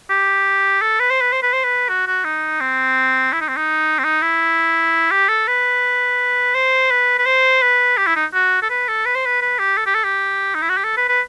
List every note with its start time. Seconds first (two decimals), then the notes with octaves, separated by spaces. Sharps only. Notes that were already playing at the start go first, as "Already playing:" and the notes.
0.10 G4
0.82 A4
1.00 B4
1.10 C5
1.21 B4
1.33 C5
1.43 B4
1.53 C5
1.64 B4
1.89 F#4
2.07 F#4
2.25 D#4
2.61 C4
3.33 E4
3.41 D#4
3.48 C4
3.57 D#4
3.99 C4
4.04 D#4
4.22 E4
5.11 G4
5.29 A4
5.48 B4
6.55 C5
6.91 B4
7.19 B4
7.26 C5
7.62 B4
7.98 G4
8.07 E4
8.16 D#4
8.34 F#4
8.62 A4
8.70 B4
8.88 A4
9.05 B4
9.15 C5
9.26 B4
9.41 B4
9.59 G4
9.78 A4
9.86 G4
9.95 A4
10.04 G4
10.55 D#4
10.62 E4
10.69 F#4
10.77 G4
10.84 A4
10.97 B4
11.09 B4